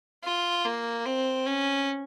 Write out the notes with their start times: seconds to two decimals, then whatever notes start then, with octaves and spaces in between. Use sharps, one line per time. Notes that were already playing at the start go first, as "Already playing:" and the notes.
0.24 F4
0.65 A#3
1.06 C4
1.46 C#4